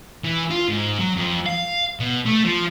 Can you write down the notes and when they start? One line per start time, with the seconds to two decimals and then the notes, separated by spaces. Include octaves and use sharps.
0.24 E3
0.51 F4
0.69 G#2
0.99 F#3
1.15 F2
1.46 F5
2.00 B2
2.26 A3
2.45 F3